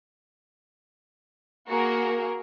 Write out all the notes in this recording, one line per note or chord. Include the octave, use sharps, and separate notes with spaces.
A#3 F#4 G#4 A#4